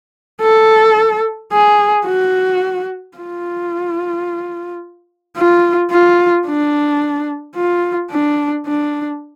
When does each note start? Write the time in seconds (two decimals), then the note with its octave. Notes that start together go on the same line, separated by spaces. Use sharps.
0.42 A4
1.53 G#4
2.06 F#4
3.17 F4
5.37 F4
5.91 F4
6.47 D4
7.56 F4
8.11 D4
8.66 D4